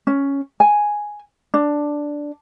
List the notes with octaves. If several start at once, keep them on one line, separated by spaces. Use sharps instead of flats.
C#4
G#5
D4